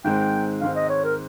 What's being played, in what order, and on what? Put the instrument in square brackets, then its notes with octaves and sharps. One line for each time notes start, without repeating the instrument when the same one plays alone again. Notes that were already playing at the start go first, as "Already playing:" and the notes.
[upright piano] G#2 D#3 G#3 C4 [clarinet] G5
[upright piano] G#2 D#3 G#3 C4 [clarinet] F5
[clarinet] D#5
C#5
A#4